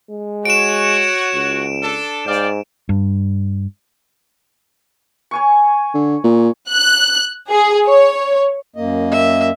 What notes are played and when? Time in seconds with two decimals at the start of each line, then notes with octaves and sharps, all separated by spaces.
0.10 G#3
0.45 F#4 C#5 D7 E7
1.34 C#2
1.83 D4 A4
2.26 G#2 D5 F5 G5
2.89 G2
5.31 C#5 G#5 C#6
5.94 D3
6.24 A#2
6.70 F#6
7.49 G#4
7.86 C#5
8.76 F#2 A#3 D#5
9.12 E5